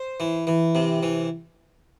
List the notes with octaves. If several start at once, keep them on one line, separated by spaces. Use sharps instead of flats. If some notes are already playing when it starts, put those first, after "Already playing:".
Already playing: C5
E3
E3
C3
E3